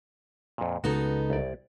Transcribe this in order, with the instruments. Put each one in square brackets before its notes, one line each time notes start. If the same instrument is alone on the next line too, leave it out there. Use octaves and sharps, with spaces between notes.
[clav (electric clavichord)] F2 A#2
[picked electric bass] C#2 C#3 [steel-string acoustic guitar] B3 D#4 A4 [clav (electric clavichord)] F#4
[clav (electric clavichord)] C2 D5